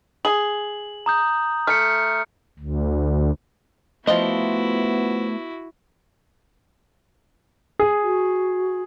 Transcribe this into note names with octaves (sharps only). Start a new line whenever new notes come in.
G#4 F#7
A#5 D#6 G6
A3 F6 C#7
D2
F3 A3 B3 E4 F#4 D#5 C6
G#4
F#4